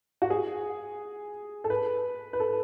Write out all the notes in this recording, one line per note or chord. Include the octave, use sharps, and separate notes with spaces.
F#4
G#4
A4
B4
B4
A4